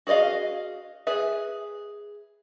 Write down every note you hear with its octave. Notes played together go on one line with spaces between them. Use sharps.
F#4 G#4 D5 D#5 F5
G#4 B4 E5